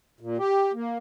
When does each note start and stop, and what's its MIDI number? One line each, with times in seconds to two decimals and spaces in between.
0.20 0.37 46
0.37 0.72 67
0.74 0.98 58